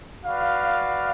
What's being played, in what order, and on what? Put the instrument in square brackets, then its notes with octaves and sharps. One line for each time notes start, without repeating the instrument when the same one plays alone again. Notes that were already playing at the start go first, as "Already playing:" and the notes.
[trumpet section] F#4 B4 D5 F5